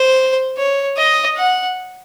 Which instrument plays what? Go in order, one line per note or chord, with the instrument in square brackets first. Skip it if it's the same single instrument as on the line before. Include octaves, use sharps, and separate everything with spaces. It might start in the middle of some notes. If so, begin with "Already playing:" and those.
Already playing: [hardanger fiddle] C5
C#5
D#5
F#5